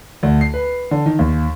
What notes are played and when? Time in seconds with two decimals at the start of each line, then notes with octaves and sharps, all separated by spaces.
0.23 D2
0.41 C7
0.54 B4
0.91 D3
1.06 D#3
1.19 D#2